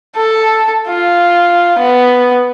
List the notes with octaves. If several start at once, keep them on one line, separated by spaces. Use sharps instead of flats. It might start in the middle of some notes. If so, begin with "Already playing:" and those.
A4
F4
B3